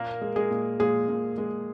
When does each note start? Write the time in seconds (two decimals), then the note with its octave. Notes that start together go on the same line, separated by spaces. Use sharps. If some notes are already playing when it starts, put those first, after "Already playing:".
Already playing: A#2 A#3 A#4
0.22 G#3
0.36 G#3 G#4
0.51 A#2
0.80 A#2 G#3 G#4
1.09 A#2
1.38 G#3